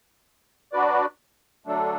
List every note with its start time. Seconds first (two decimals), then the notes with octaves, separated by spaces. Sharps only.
0.72 F#3 D4 F#4 B4 D5
1.66 D3 F#3 A3 D4 A4